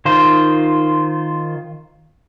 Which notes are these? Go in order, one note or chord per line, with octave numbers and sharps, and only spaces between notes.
D#3 F4 C5